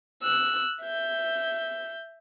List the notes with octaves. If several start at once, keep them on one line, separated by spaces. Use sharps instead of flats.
E6 F#6
E5 G6